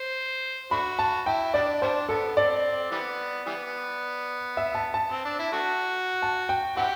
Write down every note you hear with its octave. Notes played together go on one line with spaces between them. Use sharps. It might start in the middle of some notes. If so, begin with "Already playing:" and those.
Already playing: C5
A3 D4 F#4 B5
A5
E4 G5
G3 B3 D4 D5
G3 B3 D4 C5
B3 A4
C4 D5
E3 G3 B3
E3 G3 B3
E5
A5
A5
C4
D4
E4
A3 D4 F#4
A5
G5
C4 E4 G4 F#5